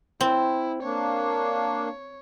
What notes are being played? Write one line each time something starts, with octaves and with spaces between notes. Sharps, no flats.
C4 E4
A#3 D4 C#5